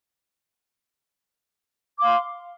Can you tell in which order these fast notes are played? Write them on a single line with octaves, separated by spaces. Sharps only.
D6 F5 C6